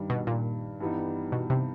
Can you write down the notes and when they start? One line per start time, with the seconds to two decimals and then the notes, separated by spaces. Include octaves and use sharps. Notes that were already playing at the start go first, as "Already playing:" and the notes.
Already playing: G2 D#3 G3
0.10 B2
0.27 A#2
0.80 G2 E3 G3 B3 D#4
1.32 B2
1.50 C3